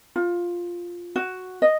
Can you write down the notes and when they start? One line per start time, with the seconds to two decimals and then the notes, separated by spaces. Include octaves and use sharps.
0.16 F4
1.16 F#4
1.62 D#5